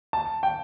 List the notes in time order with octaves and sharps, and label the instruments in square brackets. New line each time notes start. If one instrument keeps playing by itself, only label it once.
[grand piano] A5
G5